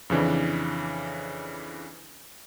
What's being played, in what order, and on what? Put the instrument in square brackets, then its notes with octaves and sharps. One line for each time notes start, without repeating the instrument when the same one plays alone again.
[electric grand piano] F2 C#3 E3 D4